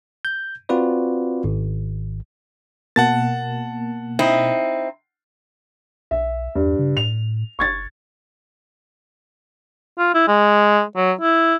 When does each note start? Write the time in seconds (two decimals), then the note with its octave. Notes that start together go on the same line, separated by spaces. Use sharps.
0.25 G6
0.69 C4 F4 F#4 B4 D5
1.44 G#1
2.96 B2 A#3 F#5 A5 A6
4.19 C4 D#4 E4
6.11 B1 E5
6.55 E2 G2
6.79 C#3
6.97 A2 F7
7.59 F#1 C#6 G#6 A6
9.99 F4
10.14 E4
10.28 G#3
10.97 F#3
11.21 E4